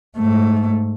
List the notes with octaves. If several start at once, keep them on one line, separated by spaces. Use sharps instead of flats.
G#2 A3